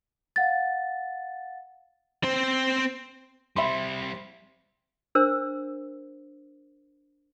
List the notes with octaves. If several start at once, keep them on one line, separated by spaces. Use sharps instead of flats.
F5 F#5 A6
C4 C5
G3 C4 E5 B5 C6
D4 A#4 C5 E6